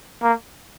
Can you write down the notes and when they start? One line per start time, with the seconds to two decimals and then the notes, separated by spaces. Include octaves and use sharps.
0.23 A#3